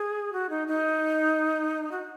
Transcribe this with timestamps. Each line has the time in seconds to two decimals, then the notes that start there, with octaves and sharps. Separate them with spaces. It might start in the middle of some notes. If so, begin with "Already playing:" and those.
Already playing: G#4
0.33 F#4
0.50 D#4
0.68 D#4
1.91 F#4